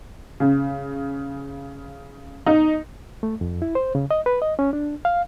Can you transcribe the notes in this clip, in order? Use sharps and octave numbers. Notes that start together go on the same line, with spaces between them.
C#3
D#4
A3
F2
E4
C5
C#3
D#5
B4
D#5
C#4
D4
F5